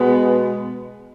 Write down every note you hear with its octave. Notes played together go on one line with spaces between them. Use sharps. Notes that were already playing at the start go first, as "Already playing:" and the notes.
Already playing: B2 G#3 B3